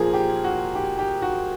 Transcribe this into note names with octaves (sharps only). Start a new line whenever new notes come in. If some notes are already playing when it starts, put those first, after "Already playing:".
Already playing: A#2 F3 G#4 A#4
G4
F#4
G4
G4
F#4